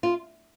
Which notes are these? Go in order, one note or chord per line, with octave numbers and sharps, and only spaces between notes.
F4